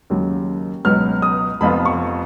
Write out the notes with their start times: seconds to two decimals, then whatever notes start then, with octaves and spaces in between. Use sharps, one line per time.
0.10 D#2 C#3 F#3
0.85 C#2 B2 F#3 B3 F6
1.22 D#6
1.61 F1 F2 F3 B3 F4 B5
1.85 C#6